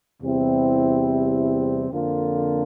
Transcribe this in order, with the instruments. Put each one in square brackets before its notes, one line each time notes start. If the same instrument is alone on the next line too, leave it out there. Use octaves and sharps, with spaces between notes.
[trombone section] E2 C3 G3 C4 E4
F2 D3 F3 A#3 F4